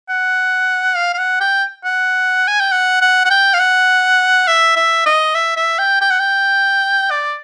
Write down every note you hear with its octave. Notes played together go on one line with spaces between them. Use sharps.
F#5
F5
F5
F#5
G5
F#5
G#5
G5
F#5
F#5
F#5
G5
F5
F#5
E5
E5
D#5
E5
E5
G5
G5
F#5
G5
D5